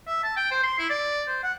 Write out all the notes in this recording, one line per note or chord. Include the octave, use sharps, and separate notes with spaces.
E5
A5
G5
C5
C6
E4
D5
C5
F#5